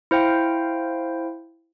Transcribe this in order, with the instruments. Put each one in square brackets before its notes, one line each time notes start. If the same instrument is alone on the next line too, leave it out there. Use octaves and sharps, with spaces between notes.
[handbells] E4 C5 F5 G5